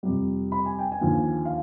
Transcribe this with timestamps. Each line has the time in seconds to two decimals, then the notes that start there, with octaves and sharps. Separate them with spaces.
0.03 F2 C3 G3
0.52 B5
0.66 G#5
0.79 G5
0.92 G#5
1.01 D#2 D3 F3
1.45 F5